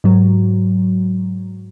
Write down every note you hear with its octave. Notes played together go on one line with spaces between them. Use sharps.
G#2 F#3